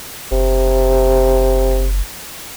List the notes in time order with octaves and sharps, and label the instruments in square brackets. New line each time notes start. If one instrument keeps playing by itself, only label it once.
[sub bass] F#1 [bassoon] C3